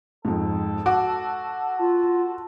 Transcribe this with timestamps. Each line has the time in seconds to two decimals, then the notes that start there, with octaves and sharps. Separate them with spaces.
0.25 F2 G#2 A4
0.86 F#4 D6
1.79 F4 A4